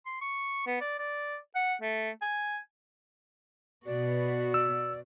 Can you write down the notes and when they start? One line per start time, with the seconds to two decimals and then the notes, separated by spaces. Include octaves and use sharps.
0.06 C6
0.21 C#6
0.66 B3
0.81 D5
0.99 D5
1.55 F#5
1.82 A3
2.21 G#5
3.86 B2 B3 F#4 D5
4.54 E6